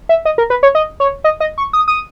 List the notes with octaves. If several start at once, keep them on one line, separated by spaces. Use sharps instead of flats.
E5
D#5
A#4
B4
C#5
D#5
C#5
D#5
D#5
C#6
D#6
D#6